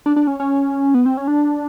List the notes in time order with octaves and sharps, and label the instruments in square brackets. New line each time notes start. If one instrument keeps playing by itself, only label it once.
[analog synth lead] D4
D4
C#4
C#4
B3
C4
C#4
D4